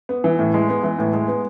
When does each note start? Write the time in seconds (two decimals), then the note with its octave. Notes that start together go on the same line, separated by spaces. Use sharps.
0.09 B3
0.24 E3
0.39 A2
0.54 G#3
0.69 B3
0.83 E3
0.99 A2
1.13 G#3
1.28 B3